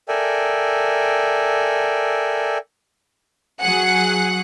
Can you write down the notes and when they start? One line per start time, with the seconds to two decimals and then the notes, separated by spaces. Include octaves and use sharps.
0.08 A4 A#4 D5 E5 G5 G#5
3.62 F#3 G#4 F#5 F#6